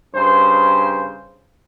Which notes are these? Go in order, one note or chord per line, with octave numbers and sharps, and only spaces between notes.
G2 C#3 C5